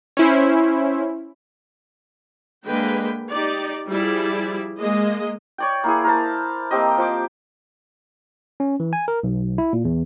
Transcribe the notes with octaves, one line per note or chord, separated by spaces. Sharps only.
C#4 E4 C5
D3 G#3 A#3 B4 G5
D#4 G4 D5
F3 G3 E4 G#4 D5
G#3 A#3 D#5
C#5 D5 G5
A#3 E4 G#4
A#4 C5 A5
A#3 C4 G4 D#5
F3 C5 D6
C#4
E3
G#5
A#4
B1
E4
A#2
E2